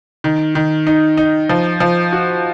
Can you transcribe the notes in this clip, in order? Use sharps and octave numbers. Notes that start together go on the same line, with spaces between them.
D#3
D#3
D#4
D#4
F3
F3
F#4